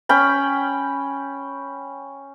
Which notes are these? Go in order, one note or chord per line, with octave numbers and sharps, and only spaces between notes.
C#4 G5 B5